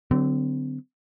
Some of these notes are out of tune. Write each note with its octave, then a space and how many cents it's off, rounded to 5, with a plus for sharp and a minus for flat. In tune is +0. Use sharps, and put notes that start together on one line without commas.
D3 +0 F#3 +20 C4 -35